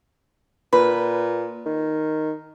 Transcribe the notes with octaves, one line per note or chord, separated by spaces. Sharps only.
A#2 B4
D#3